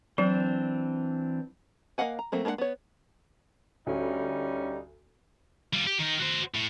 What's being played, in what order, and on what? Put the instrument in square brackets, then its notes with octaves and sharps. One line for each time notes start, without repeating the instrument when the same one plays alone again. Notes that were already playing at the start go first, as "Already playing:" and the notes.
[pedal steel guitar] E3 C4 D4 [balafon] F#3
[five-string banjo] A#3 D#5 F5 F#5 G#5
A#5
F#3 A3 A#3 C4
G#3 A#3 D4 A#4 F#5
B3 C#5
[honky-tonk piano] D2 [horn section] G3 C#4 D#4
[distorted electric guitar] G3 F4
G4
D#3 D#4
F#4 C5
A2